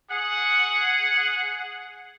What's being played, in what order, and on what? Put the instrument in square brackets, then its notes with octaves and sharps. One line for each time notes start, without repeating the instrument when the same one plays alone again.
[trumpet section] G#4 F#5